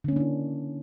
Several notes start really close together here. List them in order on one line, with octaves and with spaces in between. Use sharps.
D3 C#4 A#3 D4 E4